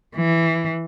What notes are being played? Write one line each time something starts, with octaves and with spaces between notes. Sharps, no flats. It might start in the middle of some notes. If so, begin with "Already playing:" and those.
E3